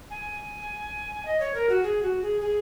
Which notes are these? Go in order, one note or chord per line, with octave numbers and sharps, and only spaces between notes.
G#5
D#5
C#5
A#4
F#4
G#4
F#4
G#4
G#4